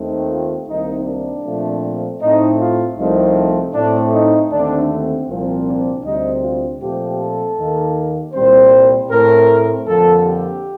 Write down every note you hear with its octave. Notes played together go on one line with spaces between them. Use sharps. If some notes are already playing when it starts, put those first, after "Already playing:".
Already playing: D#2 D#3 A3 C4
F4
C2 C3 D#3 A#3 D#4
D4
A#2 F3 A3 C4
A2 A3 C4 D#4
F4
C2 C3 F3 A3 C4 D#4
A2 A3 C4 D4
D#4
D#2 D3 A3 C4 D4
C4
C2 A#2 F3 C4
D4
D2 C3 G3 C4 D#4
F4
A#2 F3 A3 C4 G4
A4
D#2 D#3 A#3
C2 A#2 G3 C4 C5
A2 A3 C4 A#4
F2 D3 F3 A#3 A4
G4